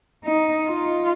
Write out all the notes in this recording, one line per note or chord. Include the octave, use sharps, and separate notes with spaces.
D#4
F4